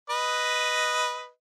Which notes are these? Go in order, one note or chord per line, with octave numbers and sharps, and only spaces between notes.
B4 D#5